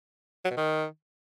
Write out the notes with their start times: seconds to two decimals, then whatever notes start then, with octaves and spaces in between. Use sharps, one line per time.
0.45 F#3
0.51 B2
0.57 D#3